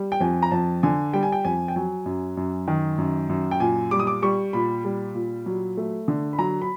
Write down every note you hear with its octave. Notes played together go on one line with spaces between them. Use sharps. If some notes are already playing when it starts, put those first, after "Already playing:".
Already playing: G3
G5
F2 G#5
A#5
F2 A5
D3 G#5
G3 G5
G#5
G5
F2 G#5
G5
F#3 G#5
F#2
F#2
D#3
F#2
F#2
G5
A#2 G#5
G3 D6
D#6
D6
G3 C#6
A#2 B5
G3
A#2
F#3
A3
D3
B5
F#3 A#5
B5